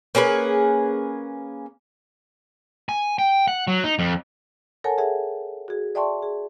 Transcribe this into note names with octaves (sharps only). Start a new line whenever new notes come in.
A#3 C#4 G#4 B4
G#5
G5
F#5
F#3
D#4
F2
A4 A#4 C#5 F#5 G#5 A5
G#4 A4 C#5 E5 F#5
F#4 G#4
D5 E5 G5 A5 C6 C#6
G#4